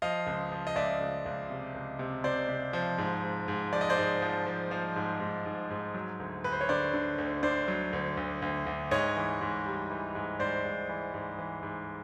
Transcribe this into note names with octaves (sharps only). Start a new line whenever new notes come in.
F3 D#5 F5
C#2
F3
D#5
C#2 D5 E5
C#2
C#2
C3
C#2
C3
C3 C5 D5
C3
F3
G#2
G#2
G#2
F3 D5
D#5
C5 D5
G#2
F3
F3
F3
G#2
G#2
G#2
G#2
F#3
D2
D2 B4
C5
C#5
D3 C5 D5
D3
D2
D3 C5 D5
F#3
D2
D2
D2
D2
G#2 C#5 D#5
E3
G#2
G3
E3
G#2
G#2 C5 D5
G#2
E3
G#2
E3
G#2